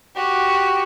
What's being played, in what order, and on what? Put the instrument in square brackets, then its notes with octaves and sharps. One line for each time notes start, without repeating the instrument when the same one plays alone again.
[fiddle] F#4 G4